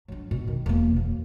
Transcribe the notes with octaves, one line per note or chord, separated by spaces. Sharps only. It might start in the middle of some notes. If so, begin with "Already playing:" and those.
F#3 D4
B2
D#3
E1 A#3
F#2